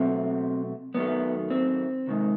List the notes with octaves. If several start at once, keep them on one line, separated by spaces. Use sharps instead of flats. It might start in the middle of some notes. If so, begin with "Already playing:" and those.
Already playing: B2 F#3 A3 C4
F#2 D#3 F#3 A3 B3
C4
C3 D#3 G#3